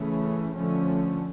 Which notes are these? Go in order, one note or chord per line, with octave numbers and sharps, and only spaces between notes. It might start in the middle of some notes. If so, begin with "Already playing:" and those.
Already playing: C#3 E3 A3 C#4
D3 F3 A3 C#4